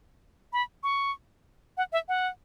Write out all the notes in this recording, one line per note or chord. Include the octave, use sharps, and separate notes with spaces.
B5
C#6
F#5
E5
F#5